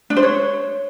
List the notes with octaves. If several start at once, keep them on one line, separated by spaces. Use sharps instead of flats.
D4
C5
C#5